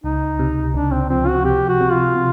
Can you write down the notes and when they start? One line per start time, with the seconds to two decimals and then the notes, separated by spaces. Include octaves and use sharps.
0.04 C#2 D#4
0.39 C3
0.74 C#2 D4
0.92 C4
1.10 F3 C4
1.27 F#4
1.44 C3 G4
1.69 F#4
1.81 C3
1.92 F4
2.15 C3